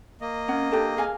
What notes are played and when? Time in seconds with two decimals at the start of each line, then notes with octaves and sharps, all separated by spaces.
0.21 A#3 D#5
0.48 C#4 F#5
0.72 D4 G4 A4
0.97 G#4 F5 G#5